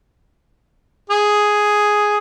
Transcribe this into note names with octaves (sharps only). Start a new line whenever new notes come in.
G#4